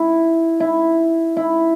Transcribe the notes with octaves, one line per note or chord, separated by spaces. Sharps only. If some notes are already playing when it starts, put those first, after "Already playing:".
Already playing: E4
E4
E4